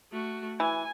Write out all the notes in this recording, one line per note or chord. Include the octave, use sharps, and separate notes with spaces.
A3 F#4
E3 G#5